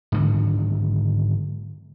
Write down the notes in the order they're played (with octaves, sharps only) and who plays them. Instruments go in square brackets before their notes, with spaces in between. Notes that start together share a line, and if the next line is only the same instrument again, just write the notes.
[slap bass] G#2 D3 D#3 F#3